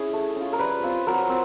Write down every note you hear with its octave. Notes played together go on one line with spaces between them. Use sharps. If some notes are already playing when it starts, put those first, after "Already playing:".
Already playing: C#4 E4 G#4
A3
C#4 F4
A#4
G3 B4
C4 F4
F#3 A#4
C4